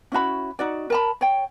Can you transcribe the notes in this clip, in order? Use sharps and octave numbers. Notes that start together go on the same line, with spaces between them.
C#4 E4 F#4 B5
D#4 F#4 D5
A#4 A5 B5
C#5 G5